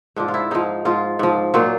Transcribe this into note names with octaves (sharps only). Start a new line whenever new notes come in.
G#2 F3 D4
F4
E4
G#2 F3 D#4
G#2 F3 F4
G#2 F3
A#2 F#3 F4